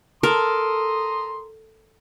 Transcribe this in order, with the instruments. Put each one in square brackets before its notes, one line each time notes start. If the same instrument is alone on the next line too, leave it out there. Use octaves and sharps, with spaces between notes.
[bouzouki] A4 [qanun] A#4 [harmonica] A#5 C6 D#6